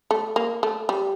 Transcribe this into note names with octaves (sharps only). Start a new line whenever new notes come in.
A3
A#3
A3
G3